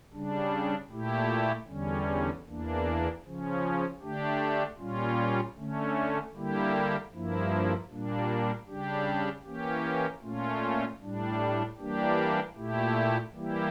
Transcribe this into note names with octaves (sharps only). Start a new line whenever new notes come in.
C#3 G3 D4
A#2 A3 E4 G4
E2 D3 G3 C#4
E2 E3 A#3 D4
C#3 F3 C#4
D3 A3 D4 G4
A#2 G3 C#4 F4
D3 A3 C#4
D3 G3 A#3 E4 G4
G2 F3 A#3 E4
A#2 G3 A#3 D4
C#3 G3 D4 G4
E3 A#3 C#4 G4
A#2 A3 C#4 F4
A2 G3 D4
E3 G3 A#3 D4 G4
A#2 A3 E4 G4
E3 G3 A#3 E4 G4